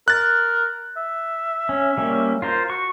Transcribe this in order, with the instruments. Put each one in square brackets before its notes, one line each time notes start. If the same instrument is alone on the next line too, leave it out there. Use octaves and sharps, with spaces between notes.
[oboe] A#4 [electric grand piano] F#6 A6
[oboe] E5
[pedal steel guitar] C#4
G3 A#3 C#4
F4 A#4 C5
[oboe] F#4 [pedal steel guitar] C#6